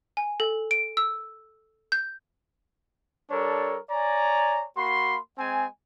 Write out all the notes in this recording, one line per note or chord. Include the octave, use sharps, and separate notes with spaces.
G#5
A4
D7
E6
G6
G3 D4 A4 A#4 C#5
C#5 D5 G#5 A#5
A#3 F#4 B5 C6
G#3 C4 G#5